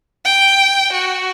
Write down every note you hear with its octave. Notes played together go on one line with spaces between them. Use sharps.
G5
F#4